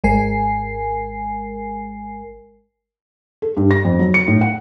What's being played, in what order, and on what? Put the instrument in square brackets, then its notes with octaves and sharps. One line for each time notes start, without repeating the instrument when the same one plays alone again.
[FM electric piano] G#1 G#3 A#4 G#5 C7
[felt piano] A4
G2
A#6
F2
F#3
C#7
A2
F#5